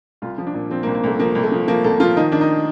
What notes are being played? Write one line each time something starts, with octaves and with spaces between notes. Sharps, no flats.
C2 F4
F3
D4
A#2
F3 C4
A#3
C2
A#3
C2 A3
F3 A#3
C2
A3
F3
F3 A#3
C2 A4
F3 F4
D#3 D#4
D#3 D4
D#4